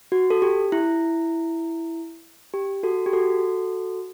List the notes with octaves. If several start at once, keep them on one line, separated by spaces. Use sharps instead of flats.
F#4
A4
G4
E4
G4
F#4 A4
G4
F#4 A4